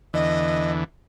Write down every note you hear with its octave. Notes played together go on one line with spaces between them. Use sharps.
E2 D3 E3 D#5